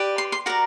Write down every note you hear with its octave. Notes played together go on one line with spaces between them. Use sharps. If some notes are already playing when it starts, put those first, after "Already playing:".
Already playing: G4 B4 D5
C6
C6
F#4 A#4 D5 A#5